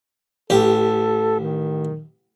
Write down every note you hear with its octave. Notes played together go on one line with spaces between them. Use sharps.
A1 G4 A4
D#3